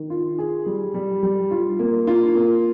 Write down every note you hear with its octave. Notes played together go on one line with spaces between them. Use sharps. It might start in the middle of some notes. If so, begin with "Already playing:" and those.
Already playing: D#3
F4
G#4
G3
G3
G3
F4
A#3
F4
A#3